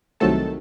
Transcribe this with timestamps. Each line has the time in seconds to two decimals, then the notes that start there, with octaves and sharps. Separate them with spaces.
0.20 C2 C3 D#3 F#3 A3 A4 A5